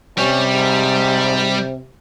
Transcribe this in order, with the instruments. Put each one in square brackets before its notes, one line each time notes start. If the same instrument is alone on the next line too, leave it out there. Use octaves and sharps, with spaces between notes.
[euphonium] C3 [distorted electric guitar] G3 [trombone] C#4
[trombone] G#2